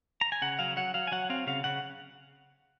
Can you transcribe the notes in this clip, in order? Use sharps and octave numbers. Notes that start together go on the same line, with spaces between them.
A#5
G#5
C#3 F#5
F#3 F5
F#3 F#5
F#3 F5
G#5
F#3 F#5
C4 F5
C#3 F5
C#3 F#5